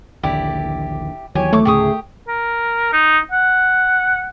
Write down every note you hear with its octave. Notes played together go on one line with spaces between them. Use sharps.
A#1 D#2 D3 E4 G4 D5
D#2 E3 F#3 G4 C#5 G#5
A3 C#6 D6
D2 A2 C#3 G4 G#4 C#6 D#6
A#4
D#4
F#5